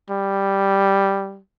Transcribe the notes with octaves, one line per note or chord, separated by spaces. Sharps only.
G3